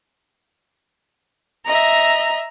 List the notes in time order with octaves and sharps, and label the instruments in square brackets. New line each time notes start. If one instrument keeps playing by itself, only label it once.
[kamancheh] D#5 E5 [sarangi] A#5